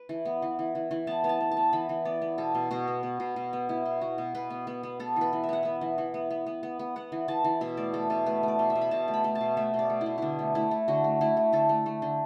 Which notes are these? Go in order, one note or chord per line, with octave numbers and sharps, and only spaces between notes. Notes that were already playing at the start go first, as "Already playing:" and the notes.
Already playing: B4
E3
B3
E3
E3
E3
E3
B3 A5
B3
A5
B3
A5
B3
E3 B5
E3
B3 D5
B3
B2 A4
B2
B2 F#4
B3
B3
B2
B2
B3
B3 E4
B2
B3 F#4
B2
B2 B4
B3
B3
B3
B3 A4
E3 B4
E3
E5
B3 F#5
B3 E5
E3
E3
B3
B3
B3
B3
B3
B3 F#5
E3
E3 A5
E3
B2 E5
A3 D5
A3 A4
B2 A4
A3 B4
A3 D5
B2
E5
B2
B5
B2 A5
A3
B5
A3
A5
B2
A3 E5
B2
D5
A3
E4
B2
D3 D4 E4
A3
A3 E4
A3
D3 F#4
A3
A3 E4
A3
D3 A4
A3
A3
D3